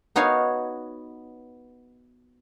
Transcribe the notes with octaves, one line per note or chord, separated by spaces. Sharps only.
B3 D#4 F#4 C#5 F5 G#5